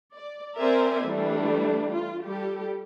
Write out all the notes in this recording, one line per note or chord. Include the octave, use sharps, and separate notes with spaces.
D5
C4 A#4 C5 D5 E5 G#5
E3 G3 A3 D4
F4
G3 G4 A4